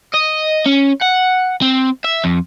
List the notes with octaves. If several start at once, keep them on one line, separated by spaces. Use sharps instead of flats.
D#5
C#4
F#5
C4
E5
F2